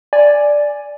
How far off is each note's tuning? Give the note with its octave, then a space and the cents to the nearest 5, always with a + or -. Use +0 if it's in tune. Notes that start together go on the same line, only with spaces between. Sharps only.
D5 +0 G#5 +0